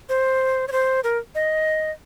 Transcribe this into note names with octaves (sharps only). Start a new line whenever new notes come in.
C5
C#5
C5
A#4
D#5